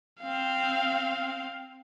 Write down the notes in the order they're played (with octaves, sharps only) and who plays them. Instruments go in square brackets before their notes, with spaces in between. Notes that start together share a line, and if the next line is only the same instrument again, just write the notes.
[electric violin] C4 F5